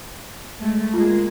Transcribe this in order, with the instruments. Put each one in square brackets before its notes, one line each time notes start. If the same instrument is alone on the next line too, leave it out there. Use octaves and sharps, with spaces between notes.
[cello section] G#3 A3
[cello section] G#3 A#3 G#4 [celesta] F4